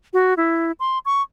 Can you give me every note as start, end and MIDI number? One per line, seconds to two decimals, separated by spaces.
0.13 0.34 66
0.37 0.72 64
0.80 0.99 84
1.05 1.22 85